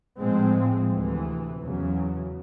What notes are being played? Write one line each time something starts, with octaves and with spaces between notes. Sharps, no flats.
A2 F3 G#3 C4
D2 C3 E3
E2 C#3 F#3